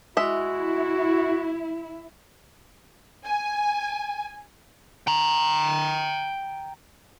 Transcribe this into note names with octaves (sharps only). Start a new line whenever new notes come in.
G#3 E4 F#4 E5
G#5
G5 A#5